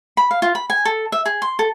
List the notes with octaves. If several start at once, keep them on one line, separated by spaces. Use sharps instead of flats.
B5
F5
F4
B5
G#5
A4
E5
G#4
C6
A4